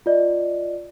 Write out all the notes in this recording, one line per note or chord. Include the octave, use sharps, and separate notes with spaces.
F4 D5 D#5